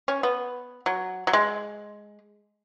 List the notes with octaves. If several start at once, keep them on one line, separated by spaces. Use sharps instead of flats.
C#4
B3
F#3
F#3
G#3